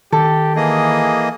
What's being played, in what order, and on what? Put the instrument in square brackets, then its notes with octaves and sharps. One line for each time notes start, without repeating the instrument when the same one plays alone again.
[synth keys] D#3 [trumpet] G4 [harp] A4
[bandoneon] E3 A#3 D#5 [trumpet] G#4